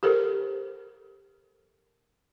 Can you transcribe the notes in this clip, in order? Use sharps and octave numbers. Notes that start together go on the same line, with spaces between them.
G4 A4 A#4 C5